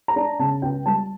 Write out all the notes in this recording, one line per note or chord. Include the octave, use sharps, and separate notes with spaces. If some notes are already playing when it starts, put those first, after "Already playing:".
A#5
D4
C#3 A5
C#2 G5
G3 A5